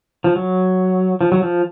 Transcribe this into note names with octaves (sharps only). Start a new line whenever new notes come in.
F3
F#3
F3
F#3
F3